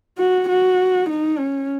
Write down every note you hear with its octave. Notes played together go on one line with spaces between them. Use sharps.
F#4
F#4
D#4
C#4